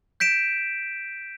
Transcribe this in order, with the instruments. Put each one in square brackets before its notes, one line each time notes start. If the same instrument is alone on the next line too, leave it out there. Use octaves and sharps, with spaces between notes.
[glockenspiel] G6 B6 D7 E7